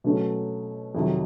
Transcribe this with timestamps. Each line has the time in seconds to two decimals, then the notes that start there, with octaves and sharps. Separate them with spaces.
0.04 B2 F#3 A3 C#4
0.95 F2 C3 D#3 F#3